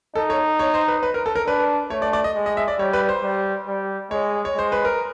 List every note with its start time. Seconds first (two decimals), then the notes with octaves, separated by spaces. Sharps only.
0.15 D#4 A4
0.30 C#5
0.59 C#5
0.74 C5
0.88 B4
1.03 B4
1.14 A#4
1.26 A4
1.36 A#4
1.47 D4 B4
1.90 A3 C#5
2.02 D5
2.13 D5
2.24 D#5
2.35 G#3
2.46 D#5
2.57 E5
2.68 D5
2.79 G3 C#5
2.93 B4
3.09 C5
3.23 G3
3.67 G3
4.11 G#3 C#5
4.45 C#5
4.55 G#3 C5
4.72 B4
4.85 A#4